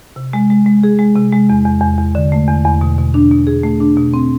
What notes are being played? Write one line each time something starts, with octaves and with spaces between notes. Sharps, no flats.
C3
G#3
G#3
G#3
G#4
G#3
C3
G#3
E2
E2
E2
E2
D3
A3
E2
E2
B2
B2
D4
B2
G#4
A3
D4
B2
C4